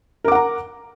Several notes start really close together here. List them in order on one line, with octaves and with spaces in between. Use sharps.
A#4 D6 F#5 A#5